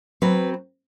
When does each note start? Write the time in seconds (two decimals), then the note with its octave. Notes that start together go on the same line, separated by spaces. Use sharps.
0.22 F#3 C4 B4